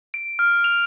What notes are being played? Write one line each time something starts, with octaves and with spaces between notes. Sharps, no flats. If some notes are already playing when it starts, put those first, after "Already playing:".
D7
F6
F7